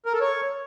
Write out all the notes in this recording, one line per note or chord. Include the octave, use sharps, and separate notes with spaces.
A#4
A4
C#5